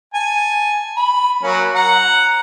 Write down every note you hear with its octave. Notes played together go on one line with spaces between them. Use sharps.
G#5 A5
B5
F#3 A#3 C#4
F#5 A#5